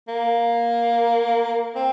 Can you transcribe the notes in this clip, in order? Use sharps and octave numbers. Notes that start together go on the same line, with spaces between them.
A#3
C4